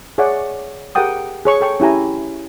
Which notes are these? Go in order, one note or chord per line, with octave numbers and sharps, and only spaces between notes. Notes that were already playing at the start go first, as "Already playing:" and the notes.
G#4 C#5 D5 E5 F#5
G4 G#4 A#4 F#5 G5 D#6
G#4 C#5 C#6
A4 G5 C#6
C#4 E4 G4 G#5 A#5